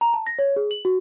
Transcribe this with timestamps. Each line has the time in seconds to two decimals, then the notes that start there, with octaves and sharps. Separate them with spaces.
0.01 A#5
0.14 A5
0.27 A#6
0.39 C#5
0.56 G#4
0.71 F#7
0.85 F#4